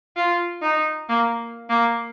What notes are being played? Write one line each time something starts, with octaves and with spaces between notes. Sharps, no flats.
F4
D#4
A#3
A#3